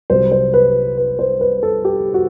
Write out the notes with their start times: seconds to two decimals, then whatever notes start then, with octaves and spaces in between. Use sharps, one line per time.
0.10 C2 C3 F#3 C5
0.32 C5
0.54 B4
0.98 B4
1.19 C5
1.41 B4
1.63 A4
1.85 G4
2.14 F#4